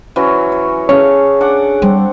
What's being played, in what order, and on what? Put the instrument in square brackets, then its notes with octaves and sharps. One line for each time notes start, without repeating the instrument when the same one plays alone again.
[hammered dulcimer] E3 F#3 C#4
C#5
[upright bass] C#4 [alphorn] G#4 [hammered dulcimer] A4 F5 [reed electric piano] C#5
[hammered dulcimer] D4 F#5 D6
[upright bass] G3 [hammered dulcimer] C4